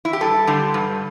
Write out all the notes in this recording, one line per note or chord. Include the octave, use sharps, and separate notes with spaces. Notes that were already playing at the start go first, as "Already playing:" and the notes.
E4
G4
G2 A4
D3 G3
G2